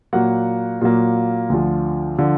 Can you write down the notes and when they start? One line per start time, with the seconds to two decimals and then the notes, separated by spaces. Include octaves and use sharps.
0.13 A#2 F#3 A#3 F#5
0.81 A#2 F#3 A#3
1.50 D2 D3 F3
2.19 D3 F3